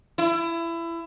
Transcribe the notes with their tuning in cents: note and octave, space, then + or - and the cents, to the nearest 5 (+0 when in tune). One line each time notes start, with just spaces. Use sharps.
E4 +25